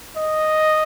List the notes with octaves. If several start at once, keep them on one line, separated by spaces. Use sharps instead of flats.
D#5